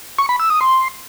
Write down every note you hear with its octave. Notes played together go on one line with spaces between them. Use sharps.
C#6
B5
E6
D#6
C6